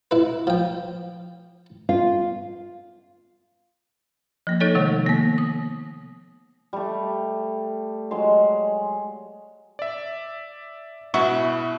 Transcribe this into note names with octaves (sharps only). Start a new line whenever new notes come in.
E4 B4
F3 G5
F4
F3 A#3
F3 D#4 A4 C#5 A6
C3 D#3 G#3 A3
A#3 B3
D#6
G3 A3
F#3 G#3 C6
D5 E5
B2 E4 F#5 C#6